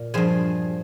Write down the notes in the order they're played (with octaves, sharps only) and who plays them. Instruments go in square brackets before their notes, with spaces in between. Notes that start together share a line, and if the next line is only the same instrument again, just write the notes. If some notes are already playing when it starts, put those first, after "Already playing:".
Already playing: [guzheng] A#2
G2 F3 G#4 C5